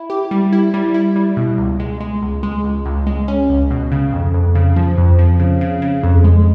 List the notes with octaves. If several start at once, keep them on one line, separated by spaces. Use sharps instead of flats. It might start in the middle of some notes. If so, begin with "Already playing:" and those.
Already playing: E4
G4
G3
E4
G3
E4
G3
B2
C#2
G#3
G#3
C#2
G#3
C#2
C#2
G#3
C#4
C#2
B2
C#3
F2
F2
C#3
F3
F2
F3
C#3
C#3
C#3
F2
G#3